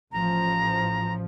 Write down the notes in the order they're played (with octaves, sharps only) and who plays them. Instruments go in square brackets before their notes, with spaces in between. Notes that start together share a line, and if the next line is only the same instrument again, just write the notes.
[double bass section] A1 F3 [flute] A#5